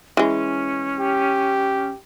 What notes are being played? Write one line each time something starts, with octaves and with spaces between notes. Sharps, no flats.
E3 G#3 C#4
G4